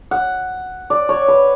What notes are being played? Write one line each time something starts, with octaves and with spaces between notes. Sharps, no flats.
F#5
D5
C#5
B4